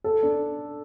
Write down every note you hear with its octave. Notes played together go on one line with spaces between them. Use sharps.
A4
D4